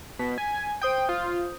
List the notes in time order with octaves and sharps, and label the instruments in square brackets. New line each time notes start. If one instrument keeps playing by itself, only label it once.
[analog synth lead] B2 [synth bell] B6
[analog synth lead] G#5
[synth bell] C5 D#6 G6 [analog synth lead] G5
[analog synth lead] F4